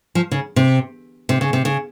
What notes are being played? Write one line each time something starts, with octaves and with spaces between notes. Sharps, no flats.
F3
C#3
C3
C3
C#3
C3
C#3